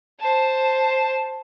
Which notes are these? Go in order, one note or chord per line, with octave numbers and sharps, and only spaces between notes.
C5 A5